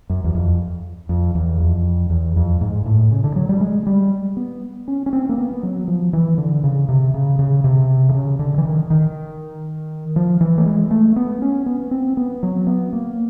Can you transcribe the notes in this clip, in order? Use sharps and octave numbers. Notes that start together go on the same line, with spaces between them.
F#2
E2
F2
F2
E2
F2
E2
F2
G#2
A2
C#3
D3
F#3
G3
G#3
G3
B3
C#4
C#4
C4
A#3
B3
F#3
F3
E3
D3
C#3
C3
C#3
C#3
C3
D3
C#3
D3
E3
D#3
D#3
F3
E3
A3
G#3
A3
B3
C#4
B3
C4
B3
F#3
B3
A#3